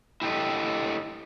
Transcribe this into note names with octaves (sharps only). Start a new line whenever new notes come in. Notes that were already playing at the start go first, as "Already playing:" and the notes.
E4 G4 A4 D#5